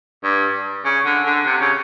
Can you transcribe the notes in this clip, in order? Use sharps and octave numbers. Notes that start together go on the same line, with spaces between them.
G2
C#3
D3
D3
C3
C#3